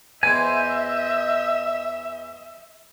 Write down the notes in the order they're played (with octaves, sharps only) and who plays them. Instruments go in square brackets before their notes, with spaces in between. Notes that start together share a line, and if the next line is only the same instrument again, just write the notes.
[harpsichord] E2 E3 [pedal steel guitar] C5 G#5 [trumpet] D#5 [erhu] E5